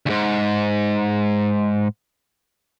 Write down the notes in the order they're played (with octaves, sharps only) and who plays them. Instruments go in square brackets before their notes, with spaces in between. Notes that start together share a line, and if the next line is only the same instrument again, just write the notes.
[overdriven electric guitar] D2 G#2